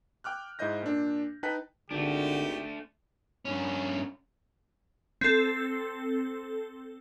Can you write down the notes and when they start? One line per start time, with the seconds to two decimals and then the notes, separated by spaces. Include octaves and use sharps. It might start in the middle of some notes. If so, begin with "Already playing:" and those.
0.24 G5 D6 F6 F#6
0.59 G#2 E4 C5 D#5 G6 A#6
0.83 A#2 D4
1.43 D#4 B4 G5 A5 F#6 B6
1.91 G#1 D3 A3 D4 G4
3.45 G2 C#4
5.21 C4 A4